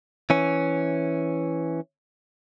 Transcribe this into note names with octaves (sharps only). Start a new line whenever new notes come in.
E3 C#4